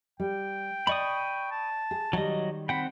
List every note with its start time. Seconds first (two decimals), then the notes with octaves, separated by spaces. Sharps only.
0.20 G3 G5
0.87 D5 D#5 B5 C#6 D#6
1.51 A5
1.91 G#4
2.13 D#3 F#3 G3 D#5
2.69 C4 F#5 G5 B5